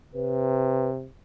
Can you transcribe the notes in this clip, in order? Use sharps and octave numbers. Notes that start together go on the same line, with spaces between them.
C3 B4